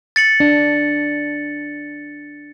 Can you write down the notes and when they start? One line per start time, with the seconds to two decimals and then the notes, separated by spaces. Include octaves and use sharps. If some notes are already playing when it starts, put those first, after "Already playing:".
0.16 A6 C#7 F#7
0.40 D4